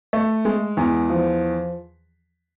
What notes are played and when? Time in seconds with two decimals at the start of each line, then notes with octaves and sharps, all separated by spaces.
0.13 A3
0.45 G#3
0.77 E2
1.10 F3